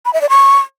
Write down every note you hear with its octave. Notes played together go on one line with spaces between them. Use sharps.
B5
E5
D5
C#6